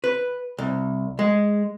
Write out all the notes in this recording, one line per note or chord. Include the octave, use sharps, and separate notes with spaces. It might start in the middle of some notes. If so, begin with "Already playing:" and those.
B4
C2
G#3